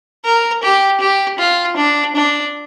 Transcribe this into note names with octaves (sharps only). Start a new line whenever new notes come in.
A#4
G4
G4
F4
D4
D4